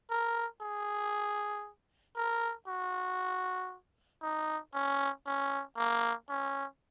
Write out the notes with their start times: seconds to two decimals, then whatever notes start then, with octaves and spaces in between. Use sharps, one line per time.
0.10 A#4
0.61 G#4
2.17 A#4
2.68 F#4
4.23 D#4
4.74 C#4
5.26 C#4
5.77 A#3
6.29 C#4